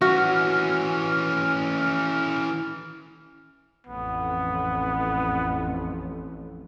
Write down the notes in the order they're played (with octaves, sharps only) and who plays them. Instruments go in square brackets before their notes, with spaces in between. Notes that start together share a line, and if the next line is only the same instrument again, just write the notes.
[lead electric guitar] E3 C#4 [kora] F#4 [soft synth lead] F6
[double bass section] A1 F2 [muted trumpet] B3